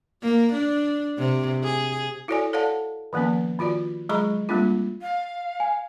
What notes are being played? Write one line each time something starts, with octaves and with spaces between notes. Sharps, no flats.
A#3
D4
C3
G#4
E4 F#4 A4 C#5 D5 G#5
A4 C#5 D5 F5 F#5 A5
D#3 F3 A#3 B3 C#4
D#3 F4 F#4 D5
F#3 G#3 G#4 A#5 B5 C#6
G3 A#3 C4 D4 F4
F5
G#5